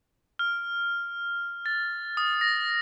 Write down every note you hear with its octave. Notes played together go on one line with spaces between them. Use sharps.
F6
A6
D#6
A#6